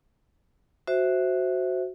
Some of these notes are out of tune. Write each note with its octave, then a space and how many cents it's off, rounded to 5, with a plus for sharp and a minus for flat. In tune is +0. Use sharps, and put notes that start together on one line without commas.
F#4 +0 C5 +0 E5 -5